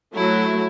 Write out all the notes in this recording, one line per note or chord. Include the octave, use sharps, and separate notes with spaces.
F#3 A3 E4